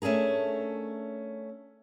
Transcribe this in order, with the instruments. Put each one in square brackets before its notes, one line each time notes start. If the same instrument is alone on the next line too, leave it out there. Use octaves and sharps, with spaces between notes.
[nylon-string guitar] A3 C#4 D4 G#4 A#4